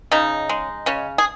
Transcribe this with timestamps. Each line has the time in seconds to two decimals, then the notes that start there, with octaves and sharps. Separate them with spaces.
0.12 C#3 D#4
0.49 G#3
0.86 C#3 C#4
1.18 G#4